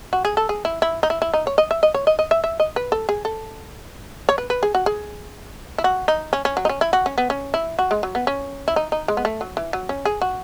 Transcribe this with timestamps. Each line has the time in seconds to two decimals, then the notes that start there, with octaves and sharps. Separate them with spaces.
0.13 F#4
0.25 G#4
0.37 A4
0.49 G#4
0.65 E4
0.82 E4
1.03 D#4
1.10 E4
1.22 E4
1.34 D#4
1.47 C#5
1.58 D#5
1.71 E5
1.83 D#5
1.94 C#5
2.07 D#5
2.19 D#5
2.31 E5
2.44 E5
2.60 D#5
2.76 B4
2.92 A4
3.09 G#4
3.25 A4
4.29 C#5
4.38 B4
4.50 B4
4.63 G#4
4.75 F#4
4.86 G#4
5.78 E4
5.84 F#4
6.08 D#4
6.33 C#4
6.45 C#4
6.57 F#3
6.65 D#4
6.69 C#4
6.81 E4
6.93 F#4
7.06 C#4
7.18 B3
7.30 C#4
7.54 E4
7.79 F#4
7.91 G#3
8.03 F#3
8.15 B3
8.27 C#4
8.68 E4
8.76 D#4
8.92 D#4
9.08 G#3
9.17 B3
9.25 A3
9.41 F#3
9.57 E3
9.73 F#3
9.89 C#4
10.05 G#4
10.22 F#4